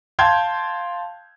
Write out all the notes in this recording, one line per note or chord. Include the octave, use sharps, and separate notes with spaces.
F5 G5 A5 C6 G6 G#6